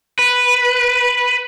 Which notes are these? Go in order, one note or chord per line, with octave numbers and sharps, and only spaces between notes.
B4